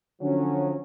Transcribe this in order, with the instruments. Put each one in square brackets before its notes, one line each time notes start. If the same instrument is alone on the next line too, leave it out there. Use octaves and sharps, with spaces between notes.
[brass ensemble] D3 F3 F#3 C#4